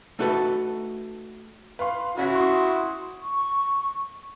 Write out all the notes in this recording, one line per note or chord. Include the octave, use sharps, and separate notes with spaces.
A3 D#4 F#4 A4 B4
B4 F5 C6
C#3 C#4 E4 F#4 B6
C6 C#6 D#6
C#6